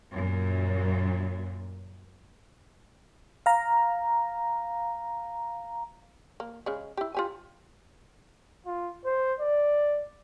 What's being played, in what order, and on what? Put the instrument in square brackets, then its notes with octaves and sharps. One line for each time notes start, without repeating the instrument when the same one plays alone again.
[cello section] F#2 A#2
[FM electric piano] F5 A#5
[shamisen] A#3
C#3 G#3
E4 G4
F4 G4 G#5
[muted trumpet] F4
C5
D5